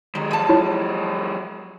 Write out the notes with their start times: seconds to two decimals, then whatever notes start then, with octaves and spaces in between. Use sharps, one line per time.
0.15 D#3 F#3 G#3
0.31 F3 A5
0.49 E4 F4 C#5